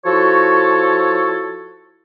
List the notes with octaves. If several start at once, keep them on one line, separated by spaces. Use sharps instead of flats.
F3 E4 F#4 A4 C#5